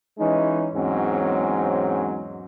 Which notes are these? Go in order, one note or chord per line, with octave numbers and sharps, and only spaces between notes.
E3 G#3 C#4 D#4
E2 G#2 F#3 C4 C#4